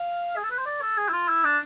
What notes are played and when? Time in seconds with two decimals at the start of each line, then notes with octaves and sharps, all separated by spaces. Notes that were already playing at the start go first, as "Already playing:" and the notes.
Already playing: F5
0.36 G#4
0.43 A4
0.51 B4
0.58 C5
0.66 D5
0.82 A4
0.97 G#4
1.09 E4
1.13 F4
1.29 E4
1.44 D4